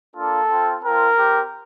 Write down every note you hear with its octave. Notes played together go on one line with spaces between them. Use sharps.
A#3 D4 F4 A4
C4 F4
C4 F4 A#4
C4 G4